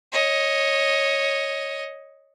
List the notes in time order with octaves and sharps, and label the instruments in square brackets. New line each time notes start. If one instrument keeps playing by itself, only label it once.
[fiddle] C#5 D#5